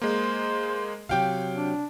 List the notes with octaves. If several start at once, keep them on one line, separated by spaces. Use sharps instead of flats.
G#3 A#3 C5
C3 F#3 G4 F5 G5
D4